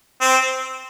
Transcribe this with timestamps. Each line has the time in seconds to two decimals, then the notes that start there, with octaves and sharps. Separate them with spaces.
0.21 C4